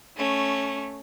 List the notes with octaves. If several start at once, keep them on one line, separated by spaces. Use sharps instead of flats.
A3 C#4